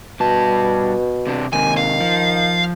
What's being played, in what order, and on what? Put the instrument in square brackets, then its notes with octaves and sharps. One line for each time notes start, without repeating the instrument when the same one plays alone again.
[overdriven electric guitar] G2 A5 [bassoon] B2
[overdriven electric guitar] C3 D4
[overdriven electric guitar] D#2 C3 [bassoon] D#3 [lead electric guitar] G#5
[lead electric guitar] F5
[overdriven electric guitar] F3